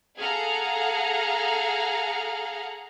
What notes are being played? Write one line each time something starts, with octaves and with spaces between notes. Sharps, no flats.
G#4 A4 F5 F#5 A#5 F6